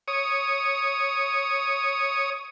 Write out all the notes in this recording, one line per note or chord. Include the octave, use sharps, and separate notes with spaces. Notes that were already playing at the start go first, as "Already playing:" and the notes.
C#5 D#6